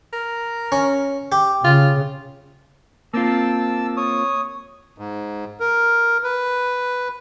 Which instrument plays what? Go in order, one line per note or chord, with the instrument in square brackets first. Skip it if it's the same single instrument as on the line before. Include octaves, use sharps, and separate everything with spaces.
[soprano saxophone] A#4
[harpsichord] C#4
G4
[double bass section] C#3 [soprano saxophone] F4
[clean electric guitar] A#3 C4 F4 [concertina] A5 E6
[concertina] C#5 D#6
[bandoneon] G#2
A#4
B4